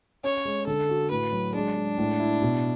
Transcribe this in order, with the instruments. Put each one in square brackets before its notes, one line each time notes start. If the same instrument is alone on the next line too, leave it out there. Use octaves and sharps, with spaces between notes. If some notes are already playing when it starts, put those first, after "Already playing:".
[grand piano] C#4 [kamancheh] C#5
[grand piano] G#3
[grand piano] D3 [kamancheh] A4
[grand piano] F#4
[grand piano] A2 [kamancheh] B4
[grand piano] F#3
[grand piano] G#3 [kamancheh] D4
[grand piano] G#3
A2
E4
B2